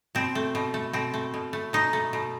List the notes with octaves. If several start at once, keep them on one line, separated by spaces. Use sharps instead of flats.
B2 C4
A3
B2
A3
B2 C4
A3
B2
A3
B2 D#4
A3
B2